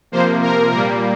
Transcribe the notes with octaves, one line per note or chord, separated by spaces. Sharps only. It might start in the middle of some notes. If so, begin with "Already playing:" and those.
C3 F3 A#3 C5
A#4
A#2 G3 A#3 A#4